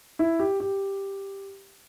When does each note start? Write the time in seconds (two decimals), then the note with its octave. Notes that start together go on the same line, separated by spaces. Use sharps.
0.19 E4
0.39 G4
0.60 G4